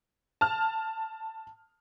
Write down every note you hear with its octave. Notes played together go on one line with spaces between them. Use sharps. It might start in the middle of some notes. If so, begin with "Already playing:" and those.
A5 F6